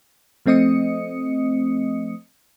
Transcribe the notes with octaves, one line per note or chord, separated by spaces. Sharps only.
F3 A3 C4 D#5 D#6 C#7